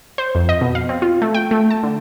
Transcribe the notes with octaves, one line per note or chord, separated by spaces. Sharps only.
C5
F2
D#5
B2
F5
C4
F4
A3
G5
A3
A5
D3